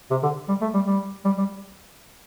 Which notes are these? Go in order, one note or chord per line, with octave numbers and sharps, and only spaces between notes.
C3
D3
G3
A3
G3
G3
G3
G3